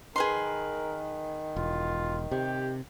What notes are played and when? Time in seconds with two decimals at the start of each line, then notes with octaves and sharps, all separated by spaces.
0.16 D#3 G#4 A#4 B4 C6
1.56 E1 F4
2.31 C3 G4